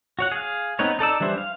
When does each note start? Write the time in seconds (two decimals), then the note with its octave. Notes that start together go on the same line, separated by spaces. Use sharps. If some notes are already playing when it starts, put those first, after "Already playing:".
0.19 F#4 C#5 F#5
0.31 G#4 F5
0.79 B3 C4 D#4 B4 C#5
0.99 D#4 A4 D5 E6
1.20 E3 G3 D4 E4 C5
1.38 F5